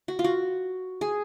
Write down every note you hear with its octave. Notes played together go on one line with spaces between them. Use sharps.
F#4
F4
F#4
G#4